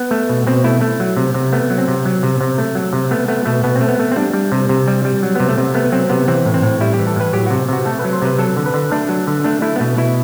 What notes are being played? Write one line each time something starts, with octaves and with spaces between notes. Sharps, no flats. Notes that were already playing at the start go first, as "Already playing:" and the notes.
Already playing: B3
A3
B2
B2 C4
A3 E4
A3
F#3
C3
C3
A3 B3
F#3
C4
C3
F#3
C3
C3
A3
F#3
C3
A3 B3
A3 B3
B2 A3
B2 B3
C4
A3
B3
A3
C4
G3 D4
G3
C3
C3
G3
G3
F#3
C3 B3
A3
C3
A3 B3
F#3 C4
C3 B3
E3 C4
A2
C4
A2
G3 E4
G4
E3
A4
A2 B4
F#3 G4
C3 F#4
C3 F#4
A3 A4
B4
F#3
C5
C3 B4
F#3 A4
D3
B4
D3
A3 D4
F#3
D3
A3 D4
A3 E4
B3
B2 A3
B2 E4